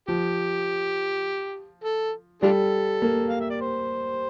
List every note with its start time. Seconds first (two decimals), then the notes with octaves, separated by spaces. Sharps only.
0.08 F3 G4
1.84 A4
2.42 G3 D4 F4 A4
3.02 A#3
3.30 F5
3.40 E5
3.50 D5
3.61 C5